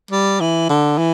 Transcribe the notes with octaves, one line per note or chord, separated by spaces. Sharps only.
G3
E3
D3
E3